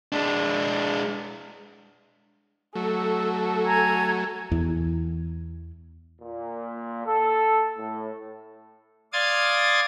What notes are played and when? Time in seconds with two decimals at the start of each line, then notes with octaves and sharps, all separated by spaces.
0.12 G#3 D4
2.75 F#3 A3 A4
3.64 G#5 A#5 G#6
4.51 E2 E3
6.21 A#2
7.06 A4
7.78 A2
9.13 D5 F5 C6 D#6 G#6 A6